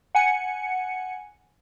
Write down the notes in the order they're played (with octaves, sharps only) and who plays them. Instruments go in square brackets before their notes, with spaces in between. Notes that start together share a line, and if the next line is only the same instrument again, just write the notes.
[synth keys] F#5 G#5 C#7